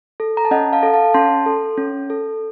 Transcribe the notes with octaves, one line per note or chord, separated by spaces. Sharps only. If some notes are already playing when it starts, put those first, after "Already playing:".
A4
A#5
A5
C#4 D#5 F#5
F5 A5
A4
F5 A5
C#4 A5 C6
A4
C#4
A4